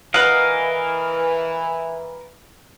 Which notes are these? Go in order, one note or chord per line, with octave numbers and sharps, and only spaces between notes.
E3 A#4 B4 D#5 F5 F#5